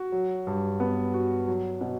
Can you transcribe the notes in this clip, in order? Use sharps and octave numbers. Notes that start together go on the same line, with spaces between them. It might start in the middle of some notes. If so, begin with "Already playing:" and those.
Already playing: F#4
F#3
G2
B3
F#4
F#3
B2